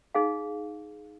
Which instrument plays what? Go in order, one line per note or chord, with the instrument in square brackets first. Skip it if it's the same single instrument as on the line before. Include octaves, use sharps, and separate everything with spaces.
[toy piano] D#4 G#4 F5